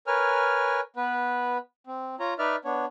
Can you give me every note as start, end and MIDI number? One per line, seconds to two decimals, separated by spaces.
0.07 0.80 70
0.07 0.80 71
0.07 0.80 73
0.07 0.80 80
0.07 0.80 89
0.96 1.58 59
0.96 1.58 71
1.87 2.15 60
2.20 2.34 65
2.20 2.34 73
2.20 2.34 82
2.39 2.56 63
2.39 2.56 71
2.39 2.56 74
2.39 2.56 76
2.39 2.56 89
2.65 2.86 59
2.65 2.86 62
2.65 2.86 73